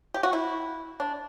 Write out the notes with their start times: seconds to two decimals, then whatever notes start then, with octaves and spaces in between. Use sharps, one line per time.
0.14 G4
0.23 F#4
0.33 E4
1.00 D4